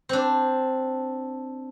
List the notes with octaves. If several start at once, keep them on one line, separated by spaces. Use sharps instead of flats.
C4 D4